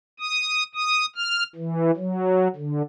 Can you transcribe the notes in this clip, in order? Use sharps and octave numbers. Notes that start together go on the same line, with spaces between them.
D#6
D#6
F6
E3
F#3
D3